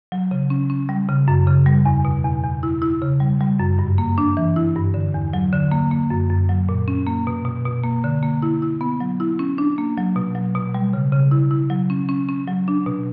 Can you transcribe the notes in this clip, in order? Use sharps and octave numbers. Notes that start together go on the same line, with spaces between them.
F#3
C#3
C#4
C#4
G3
C#3
F#2
C#3
G3
E2
B2
E2
E2
E4
E4
C#3
G3
G3
F#2
G2
A#3
D4
E3
E4
G2
D3
E2
F#3
D3
A#3
A#3
F#2
F#2
F#3
A#2
C#4
A#3
B2
B2
B2
A#3
D3
A#3
E4
E4
B3
F#3
E4
C#4
D4
A#3
F#3
B2
F#3
B2
G3
C#3
C#3
E4
E4
F#3
C#4
C#4
C#4
F#3
D4
B2